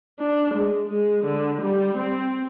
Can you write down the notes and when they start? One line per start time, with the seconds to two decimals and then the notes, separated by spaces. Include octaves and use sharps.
0.19 D4
0.54 G#3
0.88 G#3
1.24 D3
1.62 G3
1.97 C4